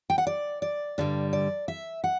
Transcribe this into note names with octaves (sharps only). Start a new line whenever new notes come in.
G5
F#5
D5
D5
G2 D3 G3
D5
E5
F#5